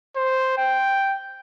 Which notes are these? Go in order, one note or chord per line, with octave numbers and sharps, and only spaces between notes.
C5
G5